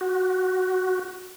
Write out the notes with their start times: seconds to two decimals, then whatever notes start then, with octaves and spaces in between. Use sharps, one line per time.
0.01 F#4